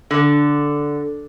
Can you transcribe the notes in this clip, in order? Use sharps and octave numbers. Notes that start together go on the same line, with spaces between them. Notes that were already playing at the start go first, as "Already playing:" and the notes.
D3